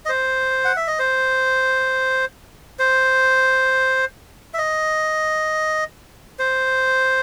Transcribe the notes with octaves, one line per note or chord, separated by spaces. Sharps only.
D#5
C5
F#5
E5
D#5
C5
C5
E5
D#5
C5